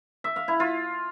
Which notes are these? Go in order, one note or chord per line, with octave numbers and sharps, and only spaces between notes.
E5
F5
E4
F4